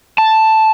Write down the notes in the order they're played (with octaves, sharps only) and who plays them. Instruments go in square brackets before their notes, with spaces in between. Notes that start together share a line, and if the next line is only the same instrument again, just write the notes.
[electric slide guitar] A5